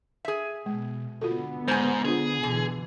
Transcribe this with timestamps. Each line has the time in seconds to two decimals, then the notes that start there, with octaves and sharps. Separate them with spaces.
0.25 G#4 E5
0.66 B2 G#3
1.21 D3 B3 F4 F#4 A4
1.68 G#2 C5 G#5
2.05 D4 F4 G#4
2.43 B2 D3 E3